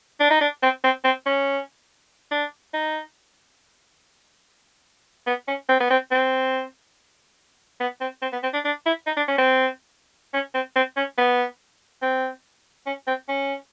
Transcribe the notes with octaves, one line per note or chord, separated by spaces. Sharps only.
D4
D#4
D4
C4
C4
C4
C#4
D4
D#4
B3
C#4
C4
B3
C4
C4
B3
C4
C4
B3
C4
D4
D4
E4
D#4
D4
C#4
C4
C#4
C4
C4
C#4
B3
C4
C#4
C4
C#4